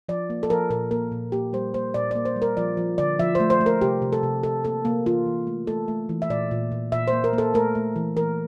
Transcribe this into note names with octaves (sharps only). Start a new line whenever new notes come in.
F3 D5
A#3
A4
F3 A#4
A#2 A#4
A#3 A#4
A#2
A#3 G4
G3 C5
A#3 C5
A#2 D5
A#3 D5
C5
G3
A#4
F3 D5
F3
D3 D5
F3 E5
A3 C5
C5
A3
A#4
C3 G4
C3
A4
C3
C3 A4
A#3 A4
C3 A#3
E3 F4
E3
A3
A3 A4
A3
E3
E5
A#2 D5
A#2
A#2
A#2 E5
C5
A#3
A#4
A#3
A4
A3 A#4
A3
E3
E3 A#4